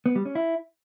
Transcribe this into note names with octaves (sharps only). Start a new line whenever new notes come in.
B3
G3
C#4
E4